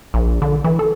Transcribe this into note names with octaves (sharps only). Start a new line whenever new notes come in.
A#1
D3
E3
A4